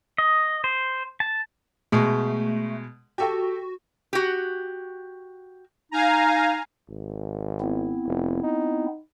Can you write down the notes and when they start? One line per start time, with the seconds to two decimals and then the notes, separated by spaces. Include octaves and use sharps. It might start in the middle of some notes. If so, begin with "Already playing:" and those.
0.18 D#5
0.64 C5
1.20 A5
1.92 B2 G#3 A3
3.18 F#4 G4 A4 G5
4.13 F#4 G4
5.91 D#4 F5 G#5 A#5
6.89 G#1
7.60 B3 C4 E4
8.07 F1
8.43 D#4